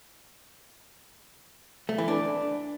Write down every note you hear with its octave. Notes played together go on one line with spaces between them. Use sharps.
A3
E3
D4